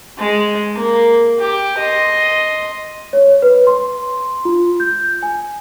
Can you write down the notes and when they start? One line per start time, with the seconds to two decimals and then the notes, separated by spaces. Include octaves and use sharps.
0.18 G#3
0.76 A#3
1.40 G4
1.78 D#5 C6
3.13 C#5
3.42 B4
3.67 C6
4.45 F4
4.80 G6
5.23 G#5